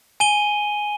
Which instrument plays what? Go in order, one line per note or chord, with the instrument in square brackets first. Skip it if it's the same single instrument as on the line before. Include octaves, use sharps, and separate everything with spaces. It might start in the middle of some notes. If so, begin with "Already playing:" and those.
[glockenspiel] G#5 D#7 G7